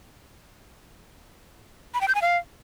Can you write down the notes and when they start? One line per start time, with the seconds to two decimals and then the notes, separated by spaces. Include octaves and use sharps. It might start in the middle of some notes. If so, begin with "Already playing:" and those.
1.94 B5
2.01 G5
2.08 G6
2.15 G#5
2.22 F5